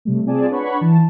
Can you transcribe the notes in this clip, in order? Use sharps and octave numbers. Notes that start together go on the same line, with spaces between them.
C3 G3 A3
C4 F4 G#4 D5 G#5 A5
D4 B4 C#5 F#5 B5 C#6
E3 A5